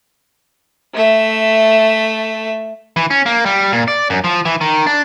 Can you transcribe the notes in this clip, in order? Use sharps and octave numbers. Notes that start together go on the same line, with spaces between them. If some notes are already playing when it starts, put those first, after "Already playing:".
A3 E5
E3
C#4
A#3
G3
A#2
D5
F#2
F3
E3
D#3
D4